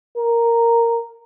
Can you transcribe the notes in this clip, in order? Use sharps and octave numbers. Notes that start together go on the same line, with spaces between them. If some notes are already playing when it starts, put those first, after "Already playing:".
A#4